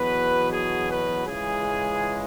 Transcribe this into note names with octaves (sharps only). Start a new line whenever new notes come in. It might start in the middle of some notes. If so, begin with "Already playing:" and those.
Already playing: E2 B2 F#3 B4
G#4
B4
C#2 C#3 E3 G#3 G#4